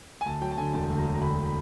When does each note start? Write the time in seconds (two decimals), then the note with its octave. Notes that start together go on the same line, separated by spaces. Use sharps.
0.21 G#5
0.26 D2 A5
0.42 F#3 G5
0.51 A5
0.58 D3 G#5
0.73 E1 A5
0.90 D2
0.98 A#5
1.06 F#3
1.14 A#5
1.22 D3 B5
1.46 B5